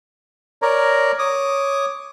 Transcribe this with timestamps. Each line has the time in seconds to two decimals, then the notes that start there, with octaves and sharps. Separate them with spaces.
0.62 A#4 C#5 D5 A#5
1.19 C#5 D6 D#6